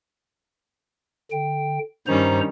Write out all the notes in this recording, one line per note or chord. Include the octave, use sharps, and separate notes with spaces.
D3 G5
G2 D#3 G3 C#4 C5 A#5